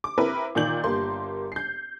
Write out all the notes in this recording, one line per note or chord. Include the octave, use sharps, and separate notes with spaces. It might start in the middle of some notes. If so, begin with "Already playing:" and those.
D6
C4 E4 A#4 B4
A#2 D#3 D5 G6 F#7
G1 G3 A#3 C6
G6 C7